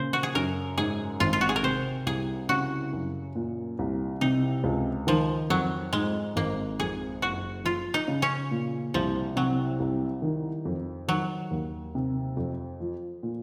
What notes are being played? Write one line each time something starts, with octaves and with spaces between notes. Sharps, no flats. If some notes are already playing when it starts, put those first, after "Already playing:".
Already playing: A#2 C#3 A#4 C5
F#4
G#4
F#2 A#4
G#2 G#4
G#1 F4
F4
F#4
G#4
A#4
C3 C5
C2 G#4
C#3 F#4
F#2
A#2
C2
C3 D#4
C#2
D#3 F3
F2 F#3
G#2 G#3
G#1 A#3
F2 G#4
F#1 F#4
F3 F4
D#4
C#3
C#4
A#2
C2 F3
C3 F#3
C2
D#3
F2
D#3 F#3
D#2
C3
F2
F3
A#2